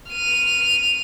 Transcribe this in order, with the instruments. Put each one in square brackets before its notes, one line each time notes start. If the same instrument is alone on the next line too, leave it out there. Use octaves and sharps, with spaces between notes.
[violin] F6 D#7